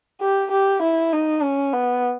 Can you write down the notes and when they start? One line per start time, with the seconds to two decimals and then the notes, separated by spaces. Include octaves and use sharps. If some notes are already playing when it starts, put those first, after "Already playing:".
0.21 G4
0.50 G4
0.82 E4
1.12 D#4
1.43 C#4
1.73 B3